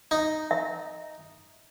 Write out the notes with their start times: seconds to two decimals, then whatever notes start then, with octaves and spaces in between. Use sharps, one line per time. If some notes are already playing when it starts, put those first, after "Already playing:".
0.11 D#4
0.51 E5